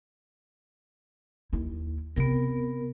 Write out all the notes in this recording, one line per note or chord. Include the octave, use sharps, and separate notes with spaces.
D#2 E4
C3 B3 C4 A#4